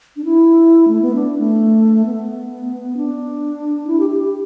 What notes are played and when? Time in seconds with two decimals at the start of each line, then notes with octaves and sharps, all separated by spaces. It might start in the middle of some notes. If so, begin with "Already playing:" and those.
0.16 D4
0.25 E4
0.88 A3
1.02 B3
1.15 D4
1.38 A3
2.06 B3
2.97 D4
3.87 E4
4.00 G4
4.10 G4
4.22 G4